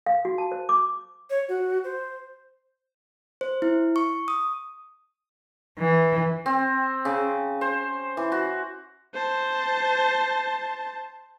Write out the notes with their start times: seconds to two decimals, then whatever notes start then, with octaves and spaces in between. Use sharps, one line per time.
0.06 F5
0.25 F#4
0.38 A5
0.52 C5
0.69 D6
1.30 C#5
1.49 F#4
1.84 C5
3.41 C5
3.62 E4
3.96 C#6
4.28 D#6
5.78 E3
6.46 C4
7.05 C#3
7.61 C5
8.17 E3
8.32 F#4
9.14 C5 A5